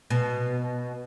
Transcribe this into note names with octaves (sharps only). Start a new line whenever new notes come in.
B2